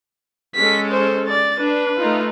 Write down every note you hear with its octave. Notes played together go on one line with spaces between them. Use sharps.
G#3 C#4 A4 B6
C5
D5 A6
D4 B4
A3 D#4 F4